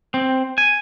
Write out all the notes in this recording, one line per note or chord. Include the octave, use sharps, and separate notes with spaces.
C4
G#5